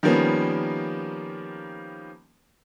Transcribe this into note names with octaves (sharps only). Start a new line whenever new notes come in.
D#3 F3 G3 A#3 B3 C#4